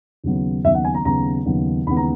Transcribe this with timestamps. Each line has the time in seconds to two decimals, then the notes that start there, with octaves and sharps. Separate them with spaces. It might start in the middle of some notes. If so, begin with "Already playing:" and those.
0.24 D#2 C#3 F#3 B3
0.64 D#2 C#3 F#3 B3 E5
0.75 F#5
0.85 G#5
0.94 A#5
1.05 D#2 C#3 F#3 B3 A#5
1.46 D#2 C#3 F#3 B3
1.87 D#2 C#3 E3 G#3 B3 B5
1.97 A#5